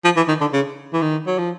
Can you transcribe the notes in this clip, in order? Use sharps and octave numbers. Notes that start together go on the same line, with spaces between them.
F3
E3
D#3
D3
C#3
E3
D#3
F#3
F3